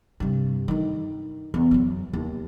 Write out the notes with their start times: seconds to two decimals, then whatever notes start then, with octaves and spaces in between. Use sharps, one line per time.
0.20 G2 C3
0.68 D3 D#3
1.54 E2
1.71 F#2 F#3
2.13 D#2